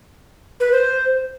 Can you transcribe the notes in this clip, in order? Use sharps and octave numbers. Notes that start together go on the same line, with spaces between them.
B4
C5